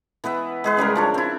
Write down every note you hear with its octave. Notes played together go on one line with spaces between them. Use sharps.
E3 B3 B4 E5
G#3 G#4 B4
C#3 G3 G#3 A#4
F3 D4 C#5
C4 E4